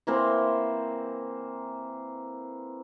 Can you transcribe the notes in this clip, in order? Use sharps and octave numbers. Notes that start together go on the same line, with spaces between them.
E3 A#3 C4 C5